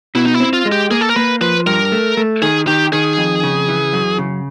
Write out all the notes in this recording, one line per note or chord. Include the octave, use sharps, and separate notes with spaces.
B2 E4
D#4
E4
C4
F4
G#3
G4
A#3 G#4
A4
A#4
A#3 B4
F3 B4
G2 A#4
A3
A3
D#3 G#4
D#3 G4
D#3 G#4
F2
C#3
E3
F#2
C#3